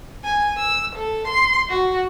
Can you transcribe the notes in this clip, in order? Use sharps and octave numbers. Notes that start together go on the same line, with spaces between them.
G#5
E6
A4
C6
F#4